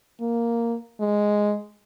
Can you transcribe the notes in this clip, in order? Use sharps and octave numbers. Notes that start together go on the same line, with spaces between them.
A#3
G#3